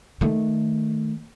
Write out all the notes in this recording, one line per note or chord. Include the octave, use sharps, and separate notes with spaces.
D#3 A3